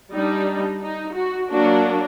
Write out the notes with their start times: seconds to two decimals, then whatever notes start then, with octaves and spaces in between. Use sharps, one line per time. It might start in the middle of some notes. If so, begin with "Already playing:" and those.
0.13 G3 D4 D#4
0.82 D#4
1.16 F#4
1.51 F#3 A#3 D4 F#4